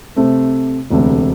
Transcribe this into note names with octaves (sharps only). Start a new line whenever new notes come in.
C3 A3 C4
E1 D2 C3 A3